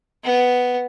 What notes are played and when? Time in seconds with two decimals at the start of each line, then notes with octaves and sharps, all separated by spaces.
0.24 B3